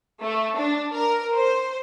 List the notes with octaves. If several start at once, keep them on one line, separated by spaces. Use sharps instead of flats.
A3
D4
A#4
C5